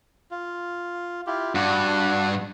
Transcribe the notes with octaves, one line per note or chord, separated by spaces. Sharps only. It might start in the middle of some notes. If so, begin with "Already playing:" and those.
F4
E4 F4 G4
G2 D4 F#4 F#5